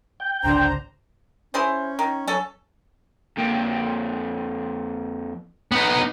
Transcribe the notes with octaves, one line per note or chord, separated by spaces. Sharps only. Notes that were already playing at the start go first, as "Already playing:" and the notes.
G5
G#1 C#2 D3 D4 C5 A#5
C#4 E4 G#4 C5
D#3
F#3 C#4 A4
F2 A#3 G5
B3 D#4